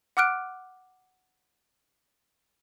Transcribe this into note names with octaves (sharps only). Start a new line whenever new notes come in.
F#5 D6 F6 F#6 D7